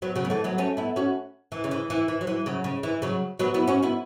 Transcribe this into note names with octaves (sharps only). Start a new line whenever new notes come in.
F#3 B3
C#3 F#3
B3
E3 A3
F#3 B3
A3 C#4
B3 E4
C#4 F#4
E3
C#3
E3
E3
E3
F#3
E3
C#3 F#3
C#3
E3
C#3 F#3
F#3 B3
B3 E4
C#4 F#4
B3 E4